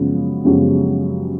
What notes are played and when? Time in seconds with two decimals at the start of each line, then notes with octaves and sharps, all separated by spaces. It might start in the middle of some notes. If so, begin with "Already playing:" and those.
Already playing: F#2 C#3 F3 G#3 B3
0.45 F#2 C#3 F3 G#3 B3 G4